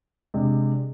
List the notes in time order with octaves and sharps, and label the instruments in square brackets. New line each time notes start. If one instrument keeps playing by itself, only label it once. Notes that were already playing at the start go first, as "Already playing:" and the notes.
[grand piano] C3 G#3 D4